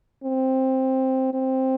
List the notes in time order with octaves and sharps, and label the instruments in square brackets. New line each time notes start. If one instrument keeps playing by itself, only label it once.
[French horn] C4
C4